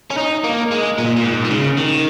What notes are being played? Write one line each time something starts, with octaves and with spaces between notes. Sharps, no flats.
C#4
D#4
A#3
G#3
A#2
A#2
G#2
A#2
C#3
D#3